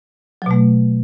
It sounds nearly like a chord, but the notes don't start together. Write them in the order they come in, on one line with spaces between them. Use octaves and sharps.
F#3 B2 A3